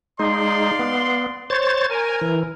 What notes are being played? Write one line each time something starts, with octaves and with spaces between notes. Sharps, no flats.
G#3 D#4 D5 F5 C6
B3
C5 C#5 A6
A#4 G#5
E3